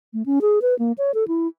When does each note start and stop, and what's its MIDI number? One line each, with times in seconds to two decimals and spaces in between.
0.13 0.23 57
0.26 0.39 61
0.41 0.59 68
0.62 0.77 71
0.79 0.92 58
0.98 1.12 73
1.14 1.27 69
1.28 1.47 64